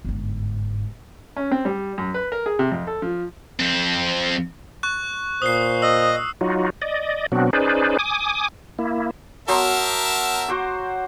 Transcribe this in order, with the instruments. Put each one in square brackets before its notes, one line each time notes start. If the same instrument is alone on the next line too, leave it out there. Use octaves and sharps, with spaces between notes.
[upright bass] G1 G#2
[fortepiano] C#4
C4
G3
F#2
B4
A#4
G#4
C3
F2
A4
F3
[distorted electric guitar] F2 C4
[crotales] C#6 F#6
[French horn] A#2 [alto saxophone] C5 [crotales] D#6 C7
[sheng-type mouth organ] D#5 [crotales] E6
[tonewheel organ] F#3 D#4 F4 F#4
D5 D#5
B2 F#3 B3 C4 D4 F#4
C#4 D#4 G#4 B4 C5 D5
G#5 D6 D#6
A#3 E4
[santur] F#3 B3 C5 [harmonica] A#4 E5 A5
[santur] F#4 C5 D6